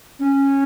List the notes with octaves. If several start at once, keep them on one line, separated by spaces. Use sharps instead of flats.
C#4